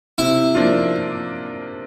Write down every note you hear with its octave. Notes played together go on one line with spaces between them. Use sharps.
C3 E4
F3 A#3 D4 F4